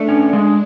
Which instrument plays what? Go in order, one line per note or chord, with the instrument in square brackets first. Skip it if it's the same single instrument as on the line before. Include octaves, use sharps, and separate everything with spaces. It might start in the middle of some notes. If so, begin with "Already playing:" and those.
Already playing: [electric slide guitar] A3 [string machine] D4
[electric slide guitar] C#4
G#3